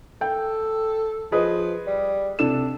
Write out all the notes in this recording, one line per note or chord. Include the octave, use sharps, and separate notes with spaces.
A4 G5
F3 G#4 B4 D#5
G3
C3 D4 A4 E7